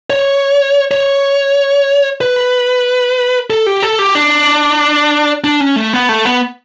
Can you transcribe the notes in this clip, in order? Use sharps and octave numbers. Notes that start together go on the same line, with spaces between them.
C#5
C#5
B4
A4
G4
A4
G4
D4
D4
C#4
A3
B3
A3
B3